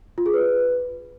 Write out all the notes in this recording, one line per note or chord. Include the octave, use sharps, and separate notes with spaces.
F4
G#4
B4